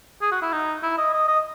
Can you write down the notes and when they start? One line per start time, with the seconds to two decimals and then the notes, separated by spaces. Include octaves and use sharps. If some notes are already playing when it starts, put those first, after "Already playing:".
0.22 G#4
0.32 F#4
0.42 E4
0.52 D#4
0.83 E4
0.98 D#5
1.13 D#5
1.28 D#5